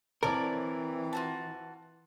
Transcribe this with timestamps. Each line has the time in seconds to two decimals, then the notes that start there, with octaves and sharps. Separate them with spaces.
0.23 E3 C4 A#4 C#5 D5 A5
1.13 F4 F#4 A5